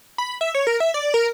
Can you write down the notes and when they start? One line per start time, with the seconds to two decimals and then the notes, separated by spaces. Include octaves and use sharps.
0.18 B5
0.41 E5
0.55 C#5
0.67 A#4
0.80 E5
0.94 D5
1.14 A#4